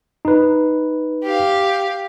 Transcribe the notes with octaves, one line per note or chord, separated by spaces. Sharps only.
D#4 B4
G4 F5